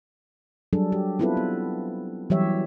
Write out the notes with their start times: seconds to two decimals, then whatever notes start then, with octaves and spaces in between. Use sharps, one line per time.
0.73 F#3 G3 D4 G#4 A4
0.92 G4
1.19 B3 C4 E4 F4 A4 B4
1.37 B3
2.30 E3 F#3 G3 G4 C#5 E5